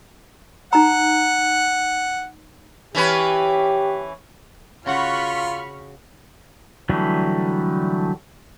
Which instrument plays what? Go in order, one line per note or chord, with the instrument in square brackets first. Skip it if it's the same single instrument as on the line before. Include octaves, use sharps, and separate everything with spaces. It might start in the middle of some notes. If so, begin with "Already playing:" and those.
[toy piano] D#4 A#5 [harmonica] F#5
[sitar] E3 C#4 B4 [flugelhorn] G4
[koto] C#3 F#4 F#5 [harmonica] F4 [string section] B5 C#6 F6
[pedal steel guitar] D3 E3 F#3 G3 A3